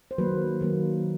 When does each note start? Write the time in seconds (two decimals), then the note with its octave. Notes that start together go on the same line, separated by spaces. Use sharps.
0.11 C5
0.18 D#3 F#3 A#3 B4
0.61 D#3 F#3 A#3